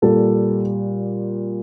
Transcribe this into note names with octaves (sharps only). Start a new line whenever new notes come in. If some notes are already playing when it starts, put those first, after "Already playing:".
A#2 G3 A4